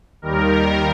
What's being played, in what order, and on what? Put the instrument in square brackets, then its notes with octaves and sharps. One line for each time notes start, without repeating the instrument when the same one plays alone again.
[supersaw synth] D#2 D#3 G3 A#4